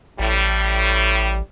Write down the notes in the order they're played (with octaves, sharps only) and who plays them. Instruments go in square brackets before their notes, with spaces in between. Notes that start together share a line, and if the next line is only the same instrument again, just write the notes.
[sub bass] A1 [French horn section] A2 G3